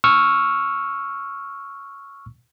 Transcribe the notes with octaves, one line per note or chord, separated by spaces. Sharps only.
C#6 E6 F6